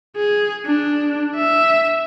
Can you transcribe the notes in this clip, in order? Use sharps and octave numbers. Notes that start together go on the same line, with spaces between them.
G#4
D4
E5